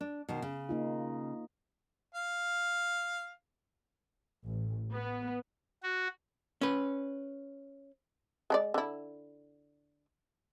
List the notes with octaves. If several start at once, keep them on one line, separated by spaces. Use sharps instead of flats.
D4
B2 D#3 C5
C#3
A#3 D#4 F4
F5
A1
B3
F#4
C#4 B4
G#3 A#4 D5
D3 E4